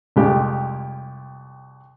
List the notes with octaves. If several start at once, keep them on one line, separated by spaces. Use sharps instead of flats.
C2 F2 G#3 G4